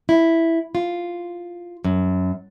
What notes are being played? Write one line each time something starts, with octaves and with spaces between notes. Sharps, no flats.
E4
F4
F#2